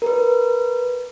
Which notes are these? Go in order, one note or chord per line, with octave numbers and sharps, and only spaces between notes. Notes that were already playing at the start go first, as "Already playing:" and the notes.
A#4 B4